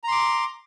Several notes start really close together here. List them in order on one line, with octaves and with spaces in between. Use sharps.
A#5 C6 D6